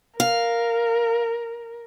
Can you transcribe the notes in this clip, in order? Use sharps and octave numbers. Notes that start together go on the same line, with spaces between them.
A#4 F5